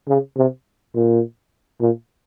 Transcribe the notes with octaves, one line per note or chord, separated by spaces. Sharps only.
C#3
C3
A#2
A#2